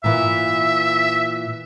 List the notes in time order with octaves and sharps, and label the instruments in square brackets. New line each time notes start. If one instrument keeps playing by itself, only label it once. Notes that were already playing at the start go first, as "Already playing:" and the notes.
[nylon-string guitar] A#2 E3 [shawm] E5